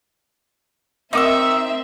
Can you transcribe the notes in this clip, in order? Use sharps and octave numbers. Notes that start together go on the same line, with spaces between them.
C4 D#4 A#4 E5 C#6 D6 E6